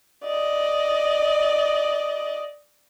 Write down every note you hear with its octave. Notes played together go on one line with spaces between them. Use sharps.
D5 D#5